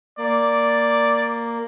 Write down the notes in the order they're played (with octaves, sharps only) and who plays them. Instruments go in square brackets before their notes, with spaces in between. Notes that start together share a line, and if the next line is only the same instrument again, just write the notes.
[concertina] A#3 [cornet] D5